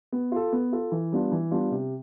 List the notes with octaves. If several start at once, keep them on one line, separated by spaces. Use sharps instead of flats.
B3
F4 A4
B3
F4 A4
E3
G3 B3 D4 F4
E3
G3 B3 D4 F4
C3